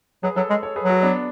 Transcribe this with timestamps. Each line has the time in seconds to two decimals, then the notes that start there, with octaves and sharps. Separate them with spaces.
0.23 F#3 G#4 B4
0.36 F#3 A4 C#5
0.50 G#3
0.63 A4 C#5
0.76 G#4 B4
0.83 F#3
0.89 F#4 A4
1.02 B3 D4